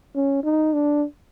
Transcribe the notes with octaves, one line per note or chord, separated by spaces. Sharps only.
C#4
D#4
D4